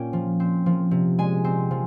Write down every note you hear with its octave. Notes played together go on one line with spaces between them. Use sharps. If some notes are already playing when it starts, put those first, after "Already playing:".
Already playing: A#2 A#3 C#4 G5
F3
C4
F3
C3
G#3 G#5
C4
F3